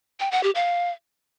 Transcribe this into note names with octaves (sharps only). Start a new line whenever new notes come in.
G5
F#5
G4
F5